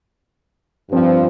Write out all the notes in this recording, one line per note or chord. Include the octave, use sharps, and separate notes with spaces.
G2 F3 C4